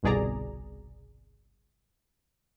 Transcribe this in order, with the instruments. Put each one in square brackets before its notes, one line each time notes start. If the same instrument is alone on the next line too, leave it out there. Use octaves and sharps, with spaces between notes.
[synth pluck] G1 C2 B2 G#4 D5 A#5